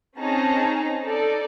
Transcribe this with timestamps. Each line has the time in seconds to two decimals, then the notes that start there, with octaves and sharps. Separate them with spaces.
0.16 C4 C#4 D#4 G#4 A5 A#5
1.05 D#4 A4 D5